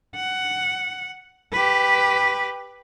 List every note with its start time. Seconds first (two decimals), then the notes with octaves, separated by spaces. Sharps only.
0.15 F#5
1.52 G4 B4